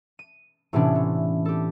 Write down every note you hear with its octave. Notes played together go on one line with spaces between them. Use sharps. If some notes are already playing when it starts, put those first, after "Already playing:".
D#7
A2 C3 E3 B3 C#4 D4
A3
G4 A4